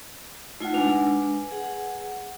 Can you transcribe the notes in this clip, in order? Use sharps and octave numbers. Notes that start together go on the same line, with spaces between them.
A3 D#4 F4 F#5
G#3 D4 B4 G#5
G#4 F#5